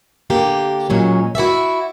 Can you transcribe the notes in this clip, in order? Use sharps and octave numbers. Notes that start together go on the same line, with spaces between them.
D3 A#3 G4
A#2 F#3 G#3 C#4
E4 F#4 D5 E5